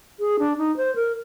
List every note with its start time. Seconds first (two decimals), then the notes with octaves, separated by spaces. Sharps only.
0.20 G#4
0.39 D4
0.58 D#4
0.77 C5
0.96 A#4